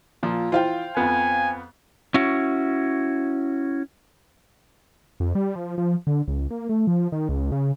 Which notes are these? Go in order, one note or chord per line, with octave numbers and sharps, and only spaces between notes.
A#2 F3
E3 F4 C5 F5 G5
F2 B3 G#5
C#4 E4 F#4
F2
G3
F3
F3
D3
C#2
A#3
A3
F3
D#3
C#2
C#3